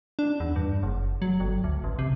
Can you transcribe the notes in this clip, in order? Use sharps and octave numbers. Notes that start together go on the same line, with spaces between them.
D4
E2
G2
F#1
F#3
G1
D2
A1
C3